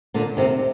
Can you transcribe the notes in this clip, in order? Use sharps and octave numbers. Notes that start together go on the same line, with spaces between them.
A#2 D3
C3 D#3